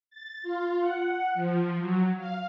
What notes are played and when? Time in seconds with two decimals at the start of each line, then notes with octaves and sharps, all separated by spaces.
0.10 A6
0.43 F4
0.80 F#5
1.34 F3
1.77 F#3
2.17 F5